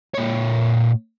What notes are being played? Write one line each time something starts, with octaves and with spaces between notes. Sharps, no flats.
A#2 C#5